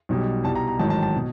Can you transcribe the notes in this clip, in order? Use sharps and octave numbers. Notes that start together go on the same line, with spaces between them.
B1 B2 G3
C2 B2 G3 A5
A#5
A#5
A1 G#2 D#3 F#3 A5
A5
A5
B2